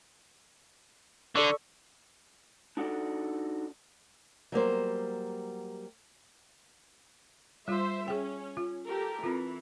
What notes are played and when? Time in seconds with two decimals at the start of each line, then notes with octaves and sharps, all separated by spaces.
1.36 D3 A4 D5 C#6
2.77 D4 D#4 F#4 A4 D5
4.52 F#3 G3 A#3 C5
7.68 G3 F4 C5 E5
8.08 C#4 G#4 G5
8.57 F4
8.87 G4 A4 A#4
9.23 E3 C4 F4